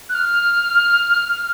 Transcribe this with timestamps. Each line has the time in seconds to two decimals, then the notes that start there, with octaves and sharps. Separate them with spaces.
0.09 F#6
0.14 F6